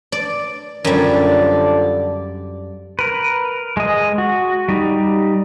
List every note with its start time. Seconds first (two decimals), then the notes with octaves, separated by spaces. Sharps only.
0.12 D5
0.85 F#2 D3 F3 G3 D5
2.99 A#4 B4
3.77 G#3 D#5
4.18 F#4
4.69 G3 D#4